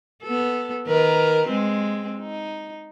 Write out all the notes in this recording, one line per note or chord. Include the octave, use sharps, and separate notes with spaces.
B3 A4
D#3 A#4 B4
G#3 C4
D#4